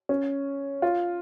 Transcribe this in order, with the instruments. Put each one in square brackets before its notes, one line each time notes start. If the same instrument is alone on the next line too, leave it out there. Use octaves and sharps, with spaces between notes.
[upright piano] C#4
F4